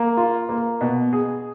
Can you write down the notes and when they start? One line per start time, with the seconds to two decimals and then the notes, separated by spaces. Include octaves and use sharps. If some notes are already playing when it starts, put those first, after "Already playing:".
Already playing: A#3
0.17 F4
0.49 A#3
0.81 B2
1.13 G#4